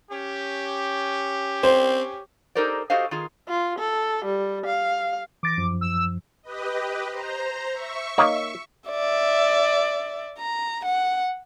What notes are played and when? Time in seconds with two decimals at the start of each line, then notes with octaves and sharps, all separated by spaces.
0.11 C#4 G4
1.63 C4 C5
2.55 D#4 G4 A4 A#4 C5 D5
2.90 F#4 G4 A4 C5 D#5 F5
3.11 D#3 F4 G#4
3.48 F4
3.79 A4
4.25 G3
4.66 F5
5.43 E3 D6 A6 A#6
5.57 F#2 F3
5.81 E6
6.42 G4 B4 D#5
7.09 C5 A#5
7.72 E5 C#6
8.18 A#3 D#4 C#5
8.89 D5 E5
10.39 A#5
10.86 F#5